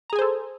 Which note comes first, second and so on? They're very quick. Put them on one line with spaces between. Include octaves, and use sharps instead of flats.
A#5 G#4 G#5 C5 A4